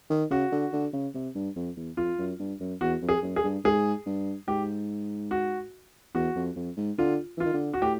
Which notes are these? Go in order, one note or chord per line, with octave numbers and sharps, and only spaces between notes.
D#3
C#3 F#4
D3
D3
C#3
C3
G2
F2
E2
F2 F4
F#2
G2
F#2
E2 F#4
F2
G#4
F#2
G#4
G2
G#2 G#4
G2
G#2 G4
F#4
E2 F#4
F2
F2
G#2
D3 F4
E3 F4
D#3
D3
F#4
A2 G4